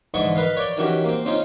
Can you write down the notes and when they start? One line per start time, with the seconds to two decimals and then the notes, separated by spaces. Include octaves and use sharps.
0.14 G#2 D3 E3 D#5 C#6
0.36 A#4 B4 D#5 F5
0.57 C#5 D5 G5
0.77 D#3 E3 C#4 F#4 G4
1.04 A#3 C4
1.25 C4 C#4 D#4 F4